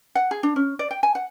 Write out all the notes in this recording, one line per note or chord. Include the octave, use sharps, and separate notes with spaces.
F#5
G#4
D4
C#4
D5
G5
G#5
F#5